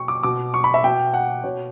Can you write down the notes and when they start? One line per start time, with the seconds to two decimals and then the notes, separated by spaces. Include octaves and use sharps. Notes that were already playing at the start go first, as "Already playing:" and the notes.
Already playing: B2 G5 C#6
0.08 D6
0.23 B2 D6
0.54 C#6
0.64 B5
0.74 E5
0.84 B2 G5
1.14 F#5
1.44 B2 C#5